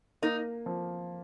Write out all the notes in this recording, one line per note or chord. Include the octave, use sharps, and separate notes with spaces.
A#3 D#4
F3